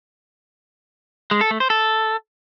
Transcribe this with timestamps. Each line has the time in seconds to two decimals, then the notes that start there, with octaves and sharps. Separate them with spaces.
1.31 G#3
1.41 A4
1.51 A3
1.60 C5
1.70 A4